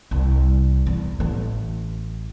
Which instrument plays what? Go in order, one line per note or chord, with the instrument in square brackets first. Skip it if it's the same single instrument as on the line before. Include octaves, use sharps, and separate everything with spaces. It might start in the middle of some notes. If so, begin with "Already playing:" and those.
[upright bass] C2
E2
A1